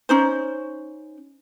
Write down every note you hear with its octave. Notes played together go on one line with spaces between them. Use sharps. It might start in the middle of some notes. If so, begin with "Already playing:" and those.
C#4 D#4 C5